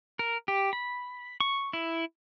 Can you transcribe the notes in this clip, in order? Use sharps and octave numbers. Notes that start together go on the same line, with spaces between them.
A#4
G4
B5
C#6
E4